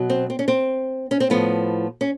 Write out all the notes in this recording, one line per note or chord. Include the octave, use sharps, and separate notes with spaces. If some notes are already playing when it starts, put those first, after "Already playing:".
Already playing: B2 F#3
C4
C4
C#4
C4
C#4
C4
A2 F3 B3
C#4